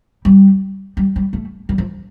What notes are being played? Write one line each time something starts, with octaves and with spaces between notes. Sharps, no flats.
G3
G3
G3
A3
G3
F3